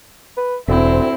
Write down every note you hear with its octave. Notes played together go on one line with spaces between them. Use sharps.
B4
E1 D2 C4 E4